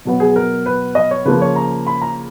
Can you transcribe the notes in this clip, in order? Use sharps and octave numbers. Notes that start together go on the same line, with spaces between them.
B2 F#3 B3
G#4
A#4
B4
D#5
C#5
C#3 F3 A#3 B4
C#5
A#5
B5
A#5